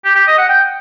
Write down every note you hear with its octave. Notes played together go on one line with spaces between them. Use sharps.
G4
G4
D#5
F#5
G5